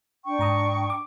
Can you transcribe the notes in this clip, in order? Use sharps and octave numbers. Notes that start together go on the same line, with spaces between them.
D4 G5 C#6
G#2 A#5 D#6
D6